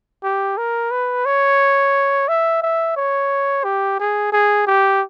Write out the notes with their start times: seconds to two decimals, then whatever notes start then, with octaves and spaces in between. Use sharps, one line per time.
0.23 G4
0.57 A#4
0.91 B4
1.26 C#5
2.28 E5
2.62 E5
2.96 C#5
3.64 G4
3.99 G#4
4.32 G#4
4.67 G4